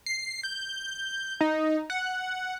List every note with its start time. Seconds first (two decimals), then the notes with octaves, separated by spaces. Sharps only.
0.06 C7
0.43 G6
1.41 D#4
1.90 F#5